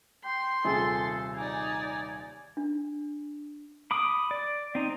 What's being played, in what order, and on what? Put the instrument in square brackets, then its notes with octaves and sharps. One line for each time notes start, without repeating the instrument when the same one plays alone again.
[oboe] G5 [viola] C6
[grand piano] D#1 C3 G#4 [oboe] A4
[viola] D#4 D5 [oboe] G#5
[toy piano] D4
[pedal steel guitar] B5 D6 D#6
D5
C4 D#4